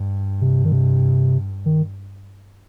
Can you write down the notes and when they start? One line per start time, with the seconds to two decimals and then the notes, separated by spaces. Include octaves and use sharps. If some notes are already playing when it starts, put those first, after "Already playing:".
Already playing: G2
0.41 C3
0.65 D#3
0.72 C3
1.66 D#3